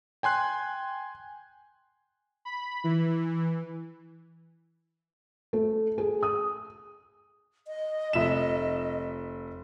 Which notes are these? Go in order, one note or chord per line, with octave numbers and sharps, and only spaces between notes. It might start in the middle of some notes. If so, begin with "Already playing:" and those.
G5 G#5 C6 F#6
B5
E3
A3
G#4
D#6
D#5
F1 E5 E7